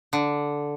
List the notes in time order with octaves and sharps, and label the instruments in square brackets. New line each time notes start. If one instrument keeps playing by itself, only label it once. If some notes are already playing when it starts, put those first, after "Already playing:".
[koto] D3